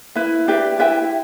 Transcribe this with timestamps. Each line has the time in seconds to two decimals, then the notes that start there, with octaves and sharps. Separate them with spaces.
0.15 E4 B4 E5
0.48 D4 G4 B4 E5
0.79 E4 B4 E5 G5